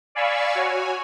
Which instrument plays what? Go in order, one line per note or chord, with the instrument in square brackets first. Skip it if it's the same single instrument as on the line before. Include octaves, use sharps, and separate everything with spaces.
[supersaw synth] D5 F5 G#5 B5 C#6 E6
F#4 C#5 G#5